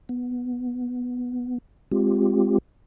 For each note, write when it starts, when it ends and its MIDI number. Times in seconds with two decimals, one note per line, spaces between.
0.09 1.58 59
1.92 2.58 56
1.92 2.58 60
1.92 2.58 65
1.92 2.58 67